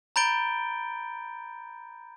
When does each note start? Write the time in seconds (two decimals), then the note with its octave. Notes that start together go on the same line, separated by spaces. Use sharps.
0.16 A#5 B5 G6 A6 D7 G7